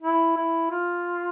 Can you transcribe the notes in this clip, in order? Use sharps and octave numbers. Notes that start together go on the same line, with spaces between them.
E4
E4
F4